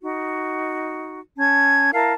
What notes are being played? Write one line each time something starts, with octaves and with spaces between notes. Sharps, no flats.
D#4 F#4
C#4 A5 G#6
E4 A#4 F5 A5